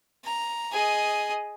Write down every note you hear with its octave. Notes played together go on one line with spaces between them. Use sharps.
A#5
G#4 D#5